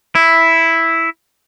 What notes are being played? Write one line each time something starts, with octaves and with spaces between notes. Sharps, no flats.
E4